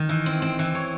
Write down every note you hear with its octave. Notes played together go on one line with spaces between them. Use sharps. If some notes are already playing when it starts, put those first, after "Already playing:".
Already playing: D#3
E3
C4
C4
E3
C#5